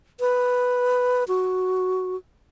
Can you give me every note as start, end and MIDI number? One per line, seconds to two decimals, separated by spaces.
0.20 1.24 71
1.28 2.16 66